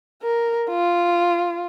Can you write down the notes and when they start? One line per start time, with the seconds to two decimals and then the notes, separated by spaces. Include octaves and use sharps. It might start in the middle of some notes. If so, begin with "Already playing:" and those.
0.23 A#4
0.70 F4